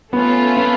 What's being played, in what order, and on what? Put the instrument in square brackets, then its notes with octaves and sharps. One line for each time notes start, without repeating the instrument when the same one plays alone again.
[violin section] A3 C#4 F4 [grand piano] B3
[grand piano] B3